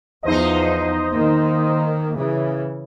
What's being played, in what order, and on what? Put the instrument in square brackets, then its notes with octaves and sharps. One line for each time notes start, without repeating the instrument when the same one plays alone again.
[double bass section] E2 F3 [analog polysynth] D#4 C5 D#5
[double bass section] D#3 A#3
C#3 E3